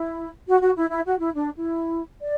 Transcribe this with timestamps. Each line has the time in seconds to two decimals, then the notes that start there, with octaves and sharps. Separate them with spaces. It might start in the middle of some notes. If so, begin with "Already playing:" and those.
Already playing: E4
0.47 F#4
0.61 F#4
0.76 E4
0.90 E4
1.05 F#4
1.20 E4
1.34 D4
1.56 E4
2.22 D5